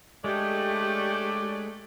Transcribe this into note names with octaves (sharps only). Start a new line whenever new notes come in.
G#3 A3 D4 G4 C#5 D5